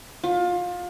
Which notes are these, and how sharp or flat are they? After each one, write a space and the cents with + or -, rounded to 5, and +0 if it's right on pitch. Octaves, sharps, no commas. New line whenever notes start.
F4 +25